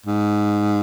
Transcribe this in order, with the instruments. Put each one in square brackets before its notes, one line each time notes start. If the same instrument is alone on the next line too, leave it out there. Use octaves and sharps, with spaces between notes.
[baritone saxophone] G#2